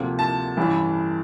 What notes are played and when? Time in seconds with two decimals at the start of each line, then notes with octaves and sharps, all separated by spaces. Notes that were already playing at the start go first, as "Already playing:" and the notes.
Already playing: D2 C3 F3 A#3
0.19 A5
0.57 A1 G2 E3